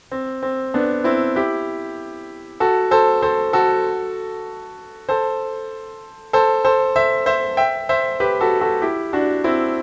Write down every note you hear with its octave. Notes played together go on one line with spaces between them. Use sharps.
C4
C4
B3 D4
C4 E4
E4 G4
F#4 A4
A4 C5
A4 C5
F#4 A4
A4 C5
A4 C5
A4 C5
C5 E5
C5 E5
E5 G5
C5 E5
G4 B4
F#4 A4
F#4 A4
E4 G4
D4 F#4
C4 E4